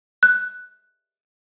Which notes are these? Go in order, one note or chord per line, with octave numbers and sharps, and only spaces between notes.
F#6